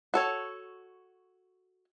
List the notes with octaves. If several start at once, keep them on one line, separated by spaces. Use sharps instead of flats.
F#4 A4 C#5